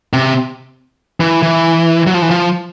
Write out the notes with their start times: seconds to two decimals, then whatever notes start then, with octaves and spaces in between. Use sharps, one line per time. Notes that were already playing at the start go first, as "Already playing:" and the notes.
0.13 C3
1.20 E3
1.43 E3
2.07 F#3
2.14 F3
2.22 E3
2.30 F3